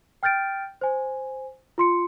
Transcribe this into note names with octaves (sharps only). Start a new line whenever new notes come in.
G5 F6 G6 A6 D7
C5 G#5
F4 C6 C#7